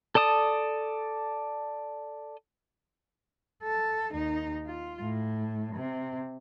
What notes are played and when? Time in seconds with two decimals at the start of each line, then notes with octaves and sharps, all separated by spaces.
0.15 A4 D5 A5 D#6
3.63 A4
4.12 D#2 D#4
4.66 F4
5.02 A2
5.75 C3